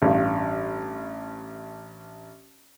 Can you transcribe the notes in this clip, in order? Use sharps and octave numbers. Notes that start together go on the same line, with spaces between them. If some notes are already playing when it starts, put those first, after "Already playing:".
A1 G2